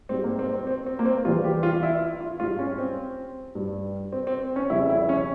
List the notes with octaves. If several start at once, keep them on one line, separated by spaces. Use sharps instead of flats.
G#2 G3 C4
A#3
C4
C4
C4
C4
A#3
C4
E2 E3 G3 F4
G4
F4
E4
F4
G#2 G3 F4
C#4
C4
G2 G3
C4
C4
C#4
F2 C#3 G3 E4
E4
C#4